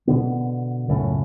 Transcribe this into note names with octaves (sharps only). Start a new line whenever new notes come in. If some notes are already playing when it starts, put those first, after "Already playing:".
B2 D3 B3
C#2 F#2 A2 C#3